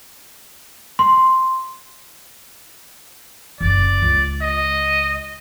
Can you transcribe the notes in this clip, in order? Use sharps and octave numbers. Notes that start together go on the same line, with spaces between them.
C6
F#1 C#3 D5
C#2
D#5